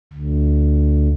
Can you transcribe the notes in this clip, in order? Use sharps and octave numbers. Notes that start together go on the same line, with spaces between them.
D2